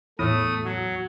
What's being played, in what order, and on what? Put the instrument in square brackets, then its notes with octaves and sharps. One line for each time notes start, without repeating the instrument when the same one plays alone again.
[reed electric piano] E2 [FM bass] A2 [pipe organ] A3 D#6
[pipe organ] F#3